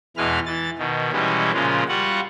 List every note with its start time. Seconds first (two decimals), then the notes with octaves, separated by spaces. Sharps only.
0.17 E2 B2 E3 G#3 B4 F6
0.46 E3 A6
0.79 B2 D#3
1.12 B2 E3 G3 G#3 C#4
1.54 A#2 C#3 F3 G#3 F4
1.88 G3 F4 F#4 F#5